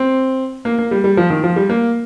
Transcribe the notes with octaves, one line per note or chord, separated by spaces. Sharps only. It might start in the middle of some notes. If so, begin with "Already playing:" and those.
Already playing: C4
A#3
A#3
G3
G3
F3
D#3
F3
G3
A#3